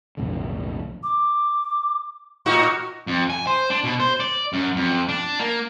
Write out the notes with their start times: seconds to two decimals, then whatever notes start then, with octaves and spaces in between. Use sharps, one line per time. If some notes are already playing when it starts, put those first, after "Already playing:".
0.17 B1 F2 A2 D3
1.03 D6
2.46 A2 D#4 F#4 C#6
3.07 F2
3.30 G#5
3.47 C5
3.70 D4
3.84 B2
4.00 C5
4.20 D5
4.53 F#2
4.76 F2
5.09 D4
5.39 A#3